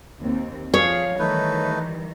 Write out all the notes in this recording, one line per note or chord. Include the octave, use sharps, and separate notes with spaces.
D#2 C4
F3 G#4 C#5 F5
D#3 E3 G3 A3 D#4 B4